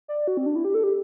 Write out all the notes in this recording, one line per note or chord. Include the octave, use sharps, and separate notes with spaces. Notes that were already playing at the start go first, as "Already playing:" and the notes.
D5
F#4
C4
D4
E4
G4
A4
G4